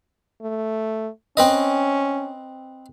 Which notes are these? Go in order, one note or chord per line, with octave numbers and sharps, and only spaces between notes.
A3
C4 C#4 B4 D#5